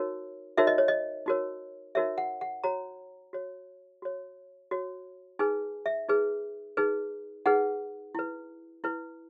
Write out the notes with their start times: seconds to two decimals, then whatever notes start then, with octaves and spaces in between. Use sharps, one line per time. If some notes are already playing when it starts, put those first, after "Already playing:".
Already playing: D#4 F#4 A#4 C#5
0.57 D#4 F#4 A#4 C#5 E5
0.67 D#5
0.78 C#5
0.88 D#5
1.26 D#4 F#4 A#4 C#5
1.95 D#4 F#4 A#4 C#5 E5
2.18 F#5
2.41 F#5
2.64 F#4 C#5 A#5
3.33 F#4 C#5
4.02 F#4 C#5
4.71 F#4 C#5
5.39 D#4 G#4 B4 G#5
5.86 E5
6.09 D#4 G#4 B4
6.77 D#4 G#4 B4
7.46 D#4 G#4 B4 F#5
8.15 E4 B4
8.84 E4 B4